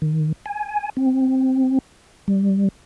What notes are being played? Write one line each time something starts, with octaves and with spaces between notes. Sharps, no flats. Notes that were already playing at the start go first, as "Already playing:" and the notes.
D#3
G#5
C4
G3